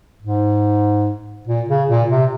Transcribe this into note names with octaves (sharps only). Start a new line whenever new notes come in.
G#2
A#2
C#3
A#2
C3